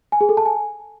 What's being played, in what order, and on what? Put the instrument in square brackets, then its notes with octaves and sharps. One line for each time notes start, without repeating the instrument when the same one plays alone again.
[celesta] G#5
G#4
A4
A5
G#5